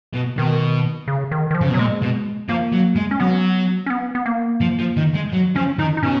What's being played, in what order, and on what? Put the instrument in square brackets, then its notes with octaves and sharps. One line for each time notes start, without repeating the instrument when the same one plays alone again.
[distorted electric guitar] B2
[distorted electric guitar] B2 [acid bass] D#3
[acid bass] C#3
D#3
D#3
F3
[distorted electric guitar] C#3
B2
[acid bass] F#3
[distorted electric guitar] A#2 [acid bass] G#3
[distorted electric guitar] B2
[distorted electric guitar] F3 [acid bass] A#3
[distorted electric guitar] F#3
G#3
[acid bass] C#4
[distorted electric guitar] F#3 [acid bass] B3
[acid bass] C#4
B3
B3
A#3
[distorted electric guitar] F3
F3
D#3
G#3
F#3
[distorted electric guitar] F3 [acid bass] C#4
[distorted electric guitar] D#3 [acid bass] D#4
[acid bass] D#4
[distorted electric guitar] B2 [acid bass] C#4